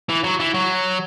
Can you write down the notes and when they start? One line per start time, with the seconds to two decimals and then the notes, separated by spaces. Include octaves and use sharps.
0.09 E3
0.24 F#3
0.40 E3
0.54 F#3